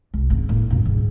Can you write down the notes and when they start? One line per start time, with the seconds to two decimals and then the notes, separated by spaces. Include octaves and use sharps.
0.14 C2
0.30 G#1 C#3
0.49 A2 A#3
0.71 F#2 A#2
0.85 D2 G#2